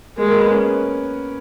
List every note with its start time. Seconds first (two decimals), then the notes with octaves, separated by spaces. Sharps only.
0.17 G#3 A#3 A#4
0.28 A#3 A#4
0.39 B3 B4
0.51 C#4 C#5